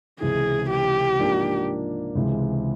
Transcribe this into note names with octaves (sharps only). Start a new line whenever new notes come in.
C#2 C3 E3 G#4
G4
G#2 F3 A#3 D4
C#2 C3 E3 G#3